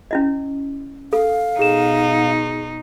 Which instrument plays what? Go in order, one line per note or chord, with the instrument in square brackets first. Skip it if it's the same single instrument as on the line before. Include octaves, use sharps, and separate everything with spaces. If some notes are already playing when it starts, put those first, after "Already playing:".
[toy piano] C#4 E4 D#5
[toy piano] A4 [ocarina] F5
[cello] B2 D#4 [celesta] G#4 E7